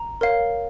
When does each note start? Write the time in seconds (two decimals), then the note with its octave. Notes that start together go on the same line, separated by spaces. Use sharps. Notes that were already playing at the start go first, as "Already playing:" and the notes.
Already playing: A#5
0.21 A#4 C#5 F5